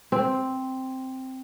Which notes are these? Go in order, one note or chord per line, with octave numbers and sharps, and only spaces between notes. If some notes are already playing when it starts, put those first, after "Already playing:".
C4